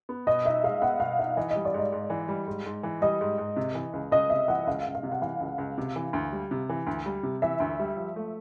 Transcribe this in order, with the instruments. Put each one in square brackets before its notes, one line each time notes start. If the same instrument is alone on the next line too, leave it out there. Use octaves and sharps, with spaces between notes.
[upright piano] B3
[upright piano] B2 [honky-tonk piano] D#5
[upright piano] D#4 [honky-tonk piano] E5
[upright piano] G#3 [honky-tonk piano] F5
[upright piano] B3 [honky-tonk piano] F#5
[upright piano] B2 [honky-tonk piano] F5
[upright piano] D#4 [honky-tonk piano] E5
[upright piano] E3 [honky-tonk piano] D#5
[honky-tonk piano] D#5
[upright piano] G3
[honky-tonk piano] D5
[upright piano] G#2 [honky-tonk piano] D#5
[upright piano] G#2
E3
G3
G#2
G#2
E3
[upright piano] G3 [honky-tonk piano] D#5
[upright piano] G#2
G#2
C3
E3
C#2
[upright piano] C#2 [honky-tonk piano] D#5
[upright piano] C3 [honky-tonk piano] E5
[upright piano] E3 [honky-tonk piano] F#5
[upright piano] C#2 [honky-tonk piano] F5
[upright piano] C#2
[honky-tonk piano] F5
[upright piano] C3
[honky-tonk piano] F#5
[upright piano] E3 [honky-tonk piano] F5
[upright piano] C#2
C#2
C3
E3
D2
G3
C3
E3
D2
G3
C3
[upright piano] E3 [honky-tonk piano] E5
[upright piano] D2
G3
F3
A3